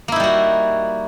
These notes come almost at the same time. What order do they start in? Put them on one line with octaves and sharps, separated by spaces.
A#3 E4 D#4 G3 F#4